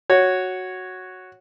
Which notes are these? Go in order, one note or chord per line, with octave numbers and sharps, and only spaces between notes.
F#4 C#5